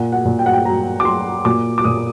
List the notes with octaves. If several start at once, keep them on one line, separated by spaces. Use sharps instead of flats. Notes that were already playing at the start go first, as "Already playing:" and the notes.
Already playing: A#2 F#5
F#5
A#2
G5
F#5
G5
F#3 A#5
D6
F#3 C6
A#2 D6
D6
A#2 D#6